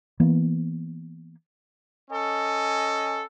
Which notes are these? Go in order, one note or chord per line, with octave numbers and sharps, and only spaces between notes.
E3 A#3 B3
C#4 A4 D#5 G#5